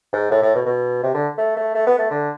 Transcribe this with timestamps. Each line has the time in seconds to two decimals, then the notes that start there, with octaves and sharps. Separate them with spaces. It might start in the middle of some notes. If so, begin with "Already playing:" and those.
0.13 G#2
0.31 A2
0.42 A2
0.55 B2
0.66 B2
1.03 C3
1.14 D3
1.38 A3
1.56 A3
1.75 A3
1.87 B3
1.99 A3
2.10 D3